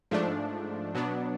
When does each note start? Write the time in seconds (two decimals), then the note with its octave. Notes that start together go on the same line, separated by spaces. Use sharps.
0.11 G#2 F3 A3 D4
0.95 B2 F#3 B3 D4